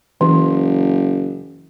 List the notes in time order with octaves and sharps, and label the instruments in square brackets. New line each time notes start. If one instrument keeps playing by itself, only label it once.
[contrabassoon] F#1 [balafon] E3